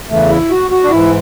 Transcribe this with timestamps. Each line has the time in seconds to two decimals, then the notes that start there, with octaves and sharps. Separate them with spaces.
0.09 E2 C#3 E3 A3
0.30 E4
0.50 F#4
0.71 F#4
0.83 D4
0.90 G#2 E3 E4